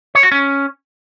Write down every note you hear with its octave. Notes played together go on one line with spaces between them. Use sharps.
C#5
F#4
C#4